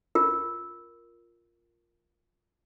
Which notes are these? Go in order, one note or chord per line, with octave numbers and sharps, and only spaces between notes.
F4 A#4